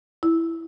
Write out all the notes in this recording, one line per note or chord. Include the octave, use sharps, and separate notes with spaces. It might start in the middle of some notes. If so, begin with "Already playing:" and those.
E4